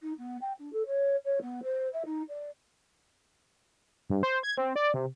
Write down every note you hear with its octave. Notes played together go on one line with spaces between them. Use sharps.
D#4
B3
G5
D4
A4
C#5
C#5
B3
C5
E5
D#4
D5
G2
C5
G#6
C4
D5
C3